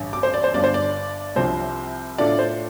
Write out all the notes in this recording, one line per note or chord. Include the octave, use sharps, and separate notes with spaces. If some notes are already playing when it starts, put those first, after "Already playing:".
Already playing: A1 G2 D3
D6
C5
D5
C5
G1 G2 D3 D5
C5
D5
C2 C3 F3 C4 C5
A2 A3 D4 F4 D5
C5